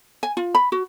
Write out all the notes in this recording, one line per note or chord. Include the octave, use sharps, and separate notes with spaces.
G#5
F4
B5
F#4